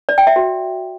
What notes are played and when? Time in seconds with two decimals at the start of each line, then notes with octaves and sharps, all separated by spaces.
0.09 D5
0.18 G5
0.27 E5
0.36 F#4